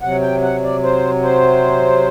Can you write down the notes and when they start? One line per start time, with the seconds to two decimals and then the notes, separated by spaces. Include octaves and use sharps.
0.01 C3 F#3 F#5
0.22 G5
0.42 F#5
0.63 D5
0.83 C5
1.22 C5